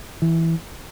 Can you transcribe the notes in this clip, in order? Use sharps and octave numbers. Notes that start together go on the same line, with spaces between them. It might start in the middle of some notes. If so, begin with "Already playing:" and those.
E3